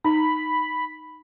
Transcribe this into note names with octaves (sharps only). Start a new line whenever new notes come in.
D#4 B5